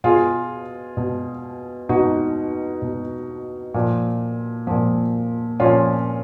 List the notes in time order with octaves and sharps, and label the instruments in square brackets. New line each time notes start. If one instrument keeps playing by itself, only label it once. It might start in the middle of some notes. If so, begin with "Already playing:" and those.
[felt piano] B2 F4 G#4
B2
B2 D#4 F#4
B2
A#2 F3
A#2 F3
A#2 F3 C#4 F4